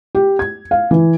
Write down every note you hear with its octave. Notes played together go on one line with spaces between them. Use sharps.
G4
G#6
F5
E3